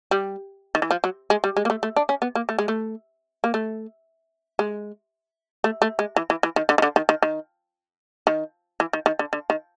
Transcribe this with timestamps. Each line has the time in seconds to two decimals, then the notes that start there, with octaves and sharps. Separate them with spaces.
0.11 G3
0.75 D#3
0.82 E3
0.91 F3
1.04 F#3
1.30 G#3
1.44 G3
1.57 G#3
1.65 A#3
1.70 A3
1.83 A3
1.96 D4
2.09 C#4
2.22 B3
2.35 A#3
2.49 A3
2.59 G#3
2.68 A3
3.44 A#3
3.54 A3
4.59 G#3
5.64 A3
5.82 A3
5.99 G#3
6.16 E3
6.30 E3
6.43 E3
6.56 D#3
6.69 D3
6.78 D#3
6.82 D3
6.96 D#3
7.09 D#3
7.23 D#3
8.27 D#3
8.80 E3
8.93 D#3
9.06 D#3
9.19 D3
9.33 D3
9.50 D#3